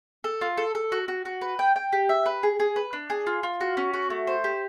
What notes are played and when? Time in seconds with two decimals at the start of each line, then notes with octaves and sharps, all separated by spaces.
0.24 A4
0.41 F4
0.57 A4
0.75 A4
0.92 F#4
1.08 F#4
1.25 F#4
1.41 B4
1.59 G5
1.76 G5
1.93 G4
2.09 E5
2.26 B4
2.43 G#4
2.60 G#4
2.76 B4
2.93 D4
3.10 G#4
3.27 F4
3.43 F4
3.61 F#4
3.77 C#4
3.94 F#4
4.10 A3
4.27 C5
4.44 G4